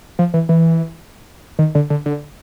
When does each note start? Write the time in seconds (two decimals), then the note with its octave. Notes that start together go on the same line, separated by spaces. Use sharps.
0.19 F3
0.34 E3
0.49 E3
1.59 D#3
1.75 D3
1.90 D3
2.06 D3